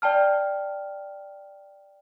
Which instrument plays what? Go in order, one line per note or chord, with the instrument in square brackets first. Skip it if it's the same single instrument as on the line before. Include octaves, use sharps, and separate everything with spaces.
[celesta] D5 G5 A5 F6